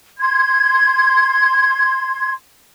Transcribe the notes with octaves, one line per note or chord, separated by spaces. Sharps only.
C6 G#6